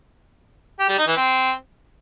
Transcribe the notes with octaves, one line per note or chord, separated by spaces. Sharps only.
G4
G3
D#4
E3
C4